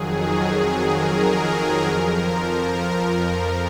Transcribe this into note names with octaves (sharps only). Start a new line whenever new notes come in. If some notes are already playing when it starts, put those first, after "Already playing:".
Already playing: F2 D#3 F#3 G#4
A#4
F2 F3